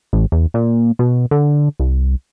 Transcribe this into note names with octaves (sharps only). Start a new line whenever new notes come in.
A1
E2
A#2
B2
D3
C2